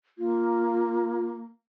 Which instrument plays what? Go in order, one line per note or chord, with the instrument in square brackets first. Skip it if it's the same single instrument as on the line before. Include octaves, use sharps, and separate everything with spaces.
[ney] A#3 [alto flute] F4